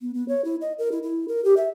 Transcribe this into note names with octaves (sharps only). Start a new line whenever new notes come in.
B3
B3
C#5
E4
D#5
A#4
E4
E4
A#4
G4
E5